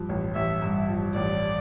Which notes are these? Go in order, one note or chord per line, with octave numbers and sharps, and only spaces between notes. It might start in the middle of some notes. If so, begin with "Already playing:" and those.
Already playing: G2 F3
A1
A1 E5
G2
F3
A1 D5